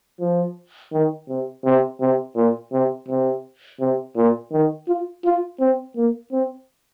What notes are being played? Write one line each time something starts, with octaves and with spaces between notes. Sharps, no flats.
F3
D#3
C3
C3
C3
A#2
C3
C3
C3
A#2
D#3
F4
F4
C4
A#3
C4